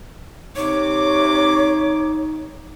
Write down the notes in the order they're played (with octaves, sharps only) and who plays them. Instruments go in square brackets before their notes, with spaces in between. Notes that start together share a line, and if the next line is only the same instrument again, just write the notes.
[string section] C3 D6 [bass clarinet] D#4 [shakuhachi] C#5